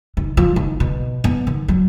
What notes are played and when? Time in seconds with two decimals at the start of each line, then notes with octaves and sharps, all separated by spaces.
0.17 D#3
0.37 F3
0.56 D#3
0.80 B2
1.24 B3
1.47 D#3
1.68 F#3